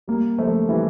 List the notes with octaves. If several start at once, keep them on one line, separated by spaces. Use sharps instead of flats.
G3 A#3
F3 A3
E3 G3